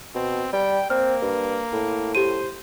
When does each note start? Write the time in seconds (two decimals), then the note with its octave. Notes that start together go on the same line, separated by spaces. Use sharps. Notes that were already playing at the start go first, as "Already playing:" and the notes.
0.15 B2 C4
0.53 G3 G5
0.90 A#3 C4 F6
1.22 G2
1.73 A2
2.15 G4 C5 D#7